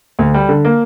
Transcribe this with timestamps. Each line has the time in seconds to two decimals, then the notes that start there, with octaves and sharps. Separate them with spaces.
0.19 D2
0.34 G3
0.49 D3
0.65 A#3